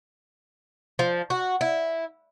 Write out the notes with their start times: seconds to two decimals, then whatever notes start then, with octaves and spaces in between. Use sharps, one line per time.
0.99 F3
1.30 F#4
1.61 E4